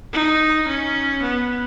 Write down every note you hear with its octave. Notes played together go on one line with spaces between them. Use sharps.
D#4
C#4
B3